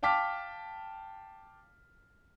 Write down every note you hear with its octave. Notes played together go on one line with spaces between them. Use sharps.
F5 G5 A5 D6 F6 B6